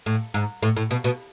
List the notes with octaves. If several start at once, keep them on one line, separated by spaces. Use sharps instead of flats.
A2
G#2
A2
A2
B2
B2